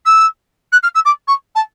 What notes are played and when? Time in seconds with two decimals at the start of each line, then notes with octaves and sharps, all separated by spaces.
0.05 E6
0.72 F#6
0.83 F6
0.95 E6
1.05 D6
1.27 C#6
1.55 A5